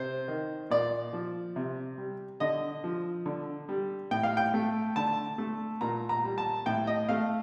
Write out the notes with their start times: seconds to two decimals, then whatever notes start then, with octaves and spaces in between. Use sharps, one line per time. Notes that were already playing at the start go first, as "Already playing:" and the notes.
Already playing: C3 C5
0.28 D#3
0.70 A#2 D5
1.13 F3
1.56 C3
1.98 G3
2.40 D3 D#5
2.84 F3
3.26 D3
3.69 G3
4.11 A2 G5
4.23 F5
4.37 G5
4.54 A3
4.96 D3 A5
5.38 A3
5.81 A#2 A#5
6.09 A#5
6.24 G3
6.38 A5
6.66 A2 G5
6.87 D#5
7.09 A3 F5